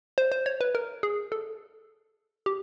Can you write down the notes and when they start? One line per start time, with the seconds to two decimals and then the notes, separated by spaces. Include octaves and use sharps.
0.18 C5
0.32 C5
0.46 C#5
0.61 B4
0.75 A#4
1.03 G#4
1.32 A4
2.46 G4